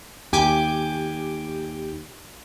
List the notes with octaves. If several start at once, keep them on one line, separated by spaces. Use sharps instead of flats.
D#2 G4 G#5 D6 G6